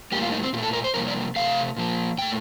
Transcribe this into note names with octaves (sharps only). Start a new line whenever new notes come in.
A2 G3 A#3 G4
F4
D#4
C4
A#2 A3 G4
A4
A#4
C5
F2 C3 G3 A#3 A#4
D5
C3 D#3 A3 F5
A#2 F3 A#3
A#2 A3 G5